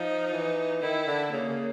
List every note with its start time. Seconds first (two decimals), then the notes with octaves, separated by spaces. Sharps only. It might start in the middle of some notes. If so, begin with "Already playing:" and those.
Already playing: F3 D#4
0.33 E3
0.82 D#3 E4
1.06 D3
1.31 C#3 A#3
1.48 C#3